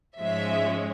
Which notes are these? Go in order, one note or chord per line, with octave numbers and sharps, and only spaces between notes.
G#2 F3 G#3 C#4 E5